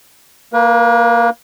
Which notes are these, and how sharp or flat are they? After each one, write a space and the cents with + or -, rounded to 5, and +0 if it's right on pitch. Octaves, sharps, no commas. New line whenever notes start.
A#3 +0 B4 -40